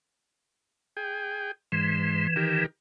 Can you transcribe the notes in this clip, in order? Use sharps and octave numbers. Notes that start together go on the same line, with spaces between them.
G#4 G5
G#2 E3 C6
D#3 G4 A#4